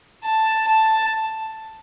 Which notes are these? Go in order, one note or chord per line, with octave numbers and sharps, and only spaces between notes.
A5
A5